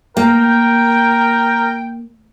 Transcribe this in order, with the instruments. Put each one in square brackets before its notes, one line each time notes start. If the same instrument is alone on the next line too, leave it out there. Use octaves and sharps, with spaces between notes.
[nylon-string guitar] A#3 [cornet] A#4 [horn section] G5